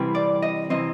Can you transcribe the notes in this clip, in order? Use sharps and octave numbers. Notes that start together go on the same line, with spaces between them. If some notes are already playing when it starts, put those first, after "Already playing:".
Already playing: C2 C3 E3 G3 C4
D5
D#5
C3 E3 C4 D#5